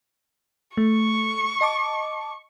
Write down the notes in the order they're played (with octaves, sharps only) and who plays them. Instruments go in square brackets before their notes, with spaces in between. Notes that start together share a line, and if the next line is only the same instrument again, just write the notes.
[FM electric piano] A3 [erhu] C#6
[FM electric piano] D#5 A5 D6